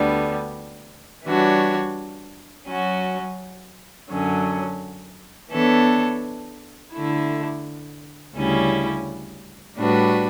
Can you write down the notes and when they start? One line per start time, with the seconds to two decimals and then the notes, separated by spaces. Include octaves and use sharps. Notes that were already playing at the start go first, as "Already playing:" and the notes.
Already playing: D2 D3 G3 B3
1.25 E3 G3 D4 F#4 C#5
2.68 F#3 C#4 F#4
4.10 F#2 D3 F#3 C#4
5.52 E3 B3 D4 A4 C#5
6.95 D3 A3 E4
8.36 D2 C#3 G3 C#4 E4
9.79 A2 G3 D4 F#4 B4